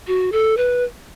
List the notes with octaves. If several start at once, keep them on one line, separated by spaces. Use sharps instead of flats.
F#4
A4
B4